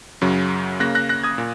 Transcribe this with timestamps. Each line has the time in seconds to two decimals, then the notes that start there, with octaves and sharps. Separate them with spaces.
0.21 F#2 C#3 F#3
0.80 C#3 A#3 F#6 A#6
0.95 F#6 A#6
1.09 F#6 A#6
1.24 D#6 G#6
1.38 A#2